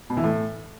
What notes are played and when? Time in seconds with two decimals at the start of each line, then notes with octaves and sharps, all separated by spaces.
0.10 B2
0.17 E3
0.24 A2